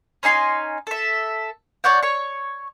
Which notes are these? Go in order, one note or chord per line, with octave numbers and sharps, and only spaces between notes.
C#4 D#4 G#5 C6
A4 E5
C#5 D5 F#5 G5
C#5 C#6